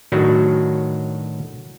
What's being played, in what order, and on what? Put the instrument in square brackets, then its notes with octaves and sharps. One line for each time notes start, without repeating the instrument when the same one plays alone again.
[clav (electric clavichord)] A2 D#3 F#3 D4 F#4 C#5